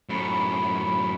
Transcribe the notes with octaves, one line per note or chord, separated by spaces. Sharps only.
F#2 A2 B5